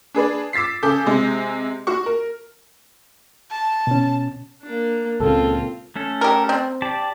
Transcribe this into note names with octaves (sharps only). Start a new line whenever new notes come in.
D4 G#4 B4 D5
D6 E6 A6 B6 C7
C#3 A4 D6 G6
C3 G#3
F#4 C#6
A#4
A5
B2 C#4
A#3 D4
C#2 A#2 C#3 C4 F4 A4
A3 C#4 A4
G4 A#4
C4
G4 D5 A5